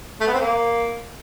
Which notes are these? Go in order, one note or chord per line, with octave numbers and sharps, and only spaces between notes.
A3
B3
C4
A#3